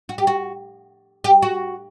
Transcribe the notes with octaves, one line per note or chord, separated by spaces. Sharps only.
F#4
G4
F#4
G4
F#4